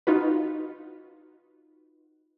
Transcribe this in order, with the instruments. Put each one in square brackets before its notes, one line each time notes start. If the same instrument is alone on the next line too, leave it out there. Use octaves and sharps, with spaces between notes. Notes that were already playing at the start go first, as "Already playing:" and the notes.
[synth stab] D#4 F4 F#4 B4